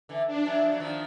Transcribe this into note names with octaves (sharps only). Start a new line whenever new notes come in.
D3 E3
D4
E3 F#3
F3
F#3
D#3 F3